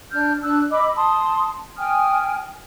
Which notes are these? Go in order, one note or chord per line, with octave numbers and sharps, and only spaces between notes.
D4 F6 G6
D4 E6 F#6
D#5 B5 D6 E6
A5 C6 D#6
G5 G#5 D#6 F6